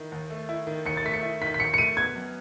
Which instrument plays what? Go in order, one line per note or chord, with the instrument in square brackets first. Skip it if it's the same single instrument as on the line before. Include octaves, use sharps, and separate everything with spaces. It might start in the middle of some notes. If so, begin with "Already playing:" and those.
Already playing: [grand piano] D#3 E4
D#2
A3
E4
D#3
[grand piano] D#2 [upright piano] C#7
[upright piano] A6
[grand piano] A3 [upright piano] B6
[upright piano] C#7
[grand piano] E4
[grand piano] D#3 [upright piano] B6
[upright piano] B6
[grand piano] D#2 [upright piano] C#7
[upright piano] C#7
[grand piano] A3 [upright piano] D#7
[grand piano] B3 [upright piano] G#6
[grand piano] F#2